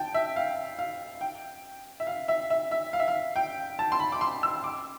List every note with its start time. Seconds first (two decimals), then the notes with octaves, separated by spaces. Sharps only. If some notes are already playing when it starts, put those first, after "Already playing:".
Already playing: G5 A5
0.14 E5
0.36 F5
0.79 F5
1.21 G5
2.00 E5
2.07 F5
2.28 E5
2.50 E5
2.71 E5
2.93 F5
3.00 E5
3.08 F5
3.36 G5
3.79 A5
3.92 C6
4.00 B5
4.12 D6
4.21 C6
4.43 E6
4.64 D6